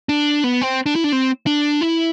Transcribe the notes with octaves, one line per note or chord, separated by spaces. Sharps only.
D4
B3
C4
D4
E4
D4
C4
D4
E4